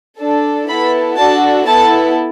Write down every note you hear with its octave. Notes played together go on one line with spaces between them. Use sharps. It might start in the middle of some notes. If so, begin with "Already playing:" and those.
D4 A4
B3 E4 A4 B5
D4 F#4 A4 A5
B3 E4 A4 A5